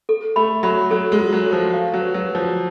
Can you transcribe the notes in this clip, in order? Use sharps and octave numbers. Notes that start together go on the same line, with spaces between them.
A4
A3 B5
F#3 B5
F#3 A4
G#3
F4
F#3
A4
F3
F5
F#3
B4
F#3
B4
F3